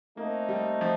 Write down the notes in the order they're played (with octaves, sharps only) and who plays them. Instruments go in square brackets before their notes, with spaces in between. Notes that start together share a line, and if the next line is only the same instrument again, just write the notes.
[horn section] A3 C4 D#4 [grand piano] A#3
[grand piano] G3
F3